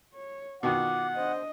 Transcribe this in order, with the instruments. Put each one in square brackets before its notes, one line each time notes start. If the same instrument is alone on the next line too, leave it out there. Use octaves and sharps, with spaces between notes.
[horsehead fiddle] C#5
[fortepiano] B2 D#3 [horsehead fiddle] F4 [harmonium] F#5 [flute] D6
[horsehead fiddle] D4 D#5 [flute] C5